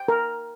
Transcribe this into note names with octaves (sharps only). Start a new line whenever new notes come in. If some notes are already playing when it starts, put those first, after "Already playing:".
Already playing: G5
A#4